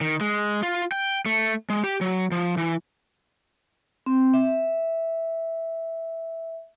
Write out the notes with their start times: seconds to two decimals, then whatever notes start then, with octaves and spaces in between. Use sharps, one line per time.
0.01 D#3
0.21 G#3
0.63 F4
0.92 G5
1.26 A3
1.70 G#3
1.84 G4
2.01 F#3
2.32 F3
2.57 E3
4.06 C4
4.34 E5